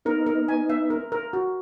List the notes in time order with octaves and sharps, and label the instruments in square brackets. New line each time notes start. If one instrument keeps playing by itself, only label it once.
[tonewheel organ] B3 D#4 [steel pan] A#4
[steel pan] A#4
G#5
E5
A#4
A#4
F#4